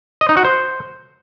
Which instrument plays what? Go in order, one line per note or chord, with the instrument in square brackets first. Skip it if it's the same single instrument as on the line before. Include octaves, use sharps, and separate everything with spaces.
[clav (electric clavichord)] D#5
D#4
F#4
C5